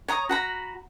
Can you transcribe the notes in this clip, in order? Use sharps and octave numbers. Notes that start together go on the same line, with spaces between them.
C#5 A#5 D#6
F#4 A#5 B5